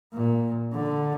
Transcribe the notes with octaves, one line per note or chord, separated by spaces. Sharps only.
A#2
D3